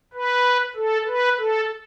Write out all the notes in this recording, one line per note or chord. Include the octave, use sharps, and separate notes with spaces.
B4
A4
B4
A4